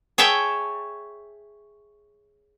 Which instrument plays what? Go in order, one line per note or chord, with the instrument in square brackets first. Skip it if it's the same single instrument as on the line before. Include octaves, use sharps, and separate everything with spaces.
[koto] G#4 C#5 E5 G5 A5